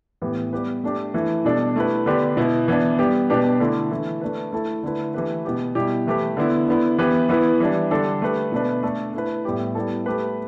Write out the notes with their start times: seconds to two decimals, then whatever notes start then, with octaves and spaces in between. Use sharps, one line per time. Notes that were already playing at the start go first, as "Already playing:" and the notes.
0.22 A2 E3 B3 G4
0.53 G3 B3 G4 B4
0.84 A3 D4 G4
1.14 E3 A3 E4
1.45 B2 G3 D4 A4
1.76 A3 E4 G4 B4
2.06 D3 B3 D4 G4 B4
2.37 B2 B3 E4
2.68 E3 B3 D4
2.99 G3 B3 G4
3.30 B2 B3 D4 G4 B4
3.60 D3 A3 E4
3.91 E3 A3 E4
4.21 A3 D4 B4
4.52 A3 E4 A4
4.83 D3 A3 E4 B4
5.14 E3 A3 G4 B4
5.45 B2 B3 G4
5.75 B2 G3 E4 G4
6.07 E3 A3 G4 B4
6.37 D3 B3 E4
6.68 D3 B3 E4
6.98 E3 B3 G4 B4
7.29 E3 B3 E4 B4
7.60 E3 G3 D4
7.91 D3 G3 D4 A4
8.22 A3 G4 B4
8.52 B2 A3 D4 B4
8.83 A3 D4 A4
9.14 A3 E4 B4
9.45 A2 G3 B3 G4
9.75 G3 B3 E4 A4
10.06 A3 G4 B4